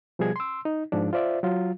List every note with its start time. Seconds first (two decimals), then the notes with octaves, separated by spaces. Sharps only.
0.19 B2 F3 G3 G#4 G#6
0.36 C6 E6
0.65 D#4
0.92 G#2 F3 D4
1.13 F4 C5 D5 E5
1.43 F#3 F4